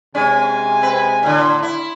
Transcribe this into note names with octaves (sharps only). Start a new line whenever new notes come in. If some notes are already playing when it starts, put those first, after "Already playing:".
C3 G#3 C#4 G#5
C4 B4
A2 D3
E4